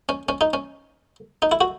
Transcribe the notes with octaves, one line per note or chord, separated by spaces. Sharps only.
C#4
C#4
D#4
C#4
D#4
E4
F#4